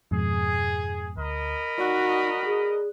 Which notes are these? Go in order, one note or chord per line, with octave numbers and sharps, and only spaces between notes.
F2 G#2 B2 G#4
D2 A#4 D#5 B5
D#4 F#4 D5 F#6
G#4